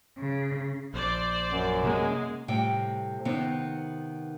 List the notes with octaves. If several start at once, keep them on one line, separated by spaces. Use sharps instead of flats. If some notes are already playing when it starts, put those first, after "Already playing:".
C#3
A#1 C5 D5
F#2
C3 G#3 A#3
A2 C3 G3 C4 G5
C3 D#3 B3 C4